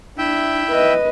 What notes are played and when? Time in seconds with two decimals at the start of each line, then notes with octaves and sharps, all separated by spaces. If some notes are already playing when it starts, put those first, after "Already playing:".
0.18 D4 E4 E5 G5
0.71 B4 D#5